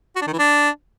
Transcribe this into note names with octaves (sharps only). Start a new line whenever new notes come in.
F#4
D4
D#3
E3
D4